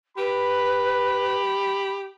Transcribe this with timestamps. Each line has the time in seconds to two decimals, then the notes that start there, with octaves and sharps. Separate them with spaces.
0.17 G4 B4 B5